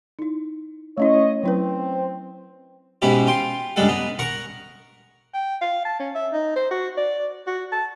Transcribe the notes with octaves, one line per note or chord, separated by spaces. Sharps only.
D#4 E4
A3 C#4 E4 C#5 D#5
F#3 C4 E4 B4
G#2 B2 C#4 E4 G4
F4 G5 C6
C#2 G2 G3 G#3 A4 F#5
B3 D#4
A#4 F#5 A#5 C#6
G5
F5
A5
C#4
E5
D#4
C5
F#4
D5
F#4
A5